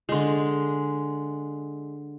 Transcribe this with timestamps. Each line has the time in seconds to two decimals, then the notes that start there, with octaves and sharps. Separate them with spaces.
0.09 D3 G#3